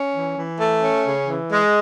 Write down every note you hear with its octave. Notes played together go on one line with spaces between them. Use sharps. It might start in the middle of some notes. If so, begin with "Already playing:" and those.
Already playing: C#4
E3
E3
A3
C#4
C#3
E3
G#3